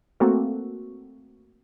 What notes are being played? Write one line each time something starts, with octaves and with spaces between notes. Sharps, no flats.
A3 A#3 C4 F#4 A4